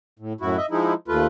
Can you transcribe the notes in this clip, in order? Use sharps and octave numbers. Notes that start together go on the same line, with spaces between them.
A2
F#2 A2 E4 F#4
D#5 E5
F3 G#3 D#4 E4
D#2 A3 F4 B4